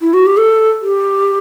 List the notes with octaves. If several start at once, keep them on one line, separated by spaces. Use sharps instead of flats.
E4
F#4
G4
A4
G4